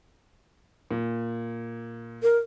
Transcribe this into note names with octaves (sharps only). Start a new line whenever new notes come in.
A#2
A#4